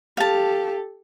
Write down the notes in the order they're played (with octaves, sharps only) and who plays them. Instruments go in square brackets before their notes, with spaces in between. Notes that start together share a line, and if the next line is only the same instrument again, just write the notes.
[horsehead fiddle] G4 A4 [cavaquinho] F5 A5